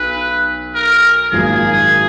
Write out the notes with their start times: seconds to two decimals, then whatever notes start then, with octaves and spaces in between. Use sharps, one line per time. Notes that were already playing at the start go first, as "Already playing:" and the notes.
Already playing: B1 B4
0.75 A#4
1.32 G#1 F#2 F3 A#3 G#4